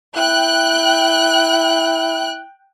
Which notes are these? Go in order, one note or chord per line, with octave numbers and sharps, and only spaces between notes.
E4 G5 F#6